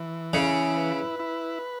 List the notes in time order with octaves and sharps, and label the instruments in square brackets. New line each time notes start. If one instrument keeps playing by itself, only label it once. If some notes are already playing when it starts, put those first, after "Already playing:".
Already playing: [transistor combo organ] E3
[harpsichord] C#3 [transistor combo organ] E4
[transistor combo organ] B4
E4